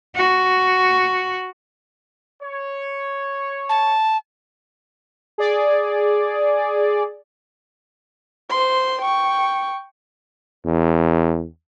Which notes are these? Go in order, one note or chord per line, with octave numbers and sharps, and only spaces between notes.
F#4
C#5
A5
G#4 D5
C5 C6
G5 C#6
E2